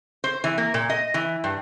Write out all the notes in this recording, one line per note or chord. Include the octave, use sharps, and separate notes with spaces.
C5
E3
A#3
A#2
D#5
E3
G2